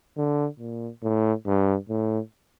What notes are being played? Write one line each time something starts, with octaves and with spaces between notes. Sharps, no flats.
D3
A#2
A2
G2
A2